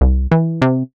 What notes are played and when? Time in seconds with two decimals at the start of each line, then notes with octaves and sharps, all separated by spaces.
0.01 C2
0.31 E3
0.62 C3